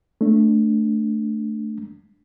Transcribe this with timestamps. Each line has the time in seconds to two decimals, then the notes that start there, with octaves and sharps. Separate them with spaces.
0.21 A3 D4